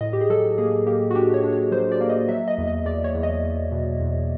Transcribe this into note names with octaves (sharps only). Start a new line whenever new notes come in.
A2 D#5
G4
G#4
F#3 A4
A#3 G#4
A#3 G4
F#4
D4 G4
C#5
D4
C#5
F#3 C5
D5
A#3
D#5
F#3 E5
D#5
E2
D#5
E2 D5
C#5
E2
D#5
E2
B2
E2